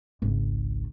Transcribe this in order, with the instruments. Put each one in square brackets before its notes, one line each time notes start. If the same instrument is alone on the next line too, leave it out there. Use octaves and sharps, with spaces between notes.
[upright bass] G#1 C#2